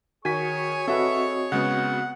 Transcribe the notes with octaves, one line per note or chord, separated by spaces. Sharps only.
D#3 F#4 G#4 C#5 G#5 C#6 B6
C4 F#4 A4 B4 D#5 E5
C#3 G#3 B3 F#5